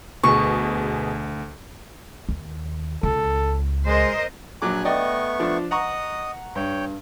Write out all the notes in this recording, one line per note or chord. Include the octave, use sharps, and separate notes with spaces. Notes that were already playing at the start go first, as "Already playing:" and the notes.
D2 B2 G#4 C#6
D#2
C#2 A4
G#3 A#4 C5 D#5
A#1 F#3 G#5 D6 F#6
A3 B3 D5 D#5 G5 C#6
F3 D4
D#5 F#5 A#5 C#6 D#6
G2 C#5 G5